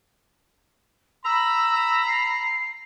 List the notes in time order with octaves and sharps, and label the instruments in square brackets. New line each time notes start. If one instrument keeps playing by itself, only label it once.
[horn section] A#5 B5 [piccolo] E6
[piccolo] C7